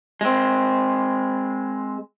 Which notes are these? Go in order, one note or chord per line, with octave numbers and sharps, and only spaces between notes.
G#3 C4